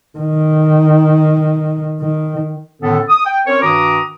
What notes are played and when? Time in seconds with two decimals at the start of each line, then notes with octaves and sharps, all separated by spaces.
0.19 D#3
2.01 D#3
2.81 A2 D3 D#3 B3 C#4 A4
3.08 D#6
3.26 G5
3.46 C4 C#4 A#4 C#5
3.62 G2 D#3 F#4 A#5 D6 D#6